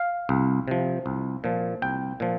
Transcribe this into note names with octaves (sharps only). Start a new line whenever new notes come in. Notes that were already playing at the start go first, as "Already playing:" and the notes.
Already playing: F5
C2
C3 F3
C2
A#2 F3
C2 G5
A#2 F3